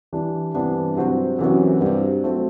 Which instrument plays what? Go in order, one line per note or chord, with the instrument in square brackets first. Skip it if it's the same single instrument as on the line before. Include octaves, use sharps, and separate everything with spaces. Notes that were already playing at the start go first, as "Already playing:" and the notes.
[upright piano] E3 G3 D4
[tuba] G2 [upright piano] C3 E3 B3 D4
[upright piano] C3 F#3 C4 F#4 C5
[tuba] F#2 [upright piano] C3 E3 B3 F#4
[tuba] G2 [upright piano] C3 G3 C4 F#4
[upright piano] F#3 A3 C4 F#4